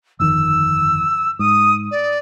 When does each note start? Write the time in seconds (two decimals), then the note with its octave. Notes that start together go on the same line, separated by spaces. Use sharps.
0.20 G1 F2 D#3 E6
1.39 G#2 D#6
1.91 D5